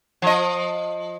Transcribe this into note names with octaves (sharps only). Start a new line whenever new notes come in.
F3 D#5